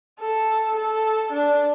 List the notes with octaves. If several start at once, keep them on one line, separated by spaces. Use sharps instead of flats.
A4
A4
D4